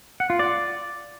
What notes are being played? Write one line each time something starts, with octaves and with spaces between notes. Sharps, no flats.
F#5
F4
D5